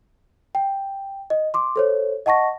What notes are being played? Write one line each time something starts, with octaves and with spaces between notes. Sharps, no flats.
G5
D#5
C6 D6
A4 C5 C#5
D#5 F#5 A5 C#6 A#6